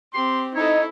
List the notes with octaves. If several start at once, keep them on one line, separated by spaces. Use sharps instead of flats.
C4 G4 C6
D#4 E4 A4 C#5